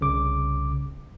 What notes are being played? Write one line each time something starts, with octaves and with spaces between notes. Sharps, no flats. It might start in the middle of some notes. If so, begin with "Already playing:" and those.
C2 C#3 D6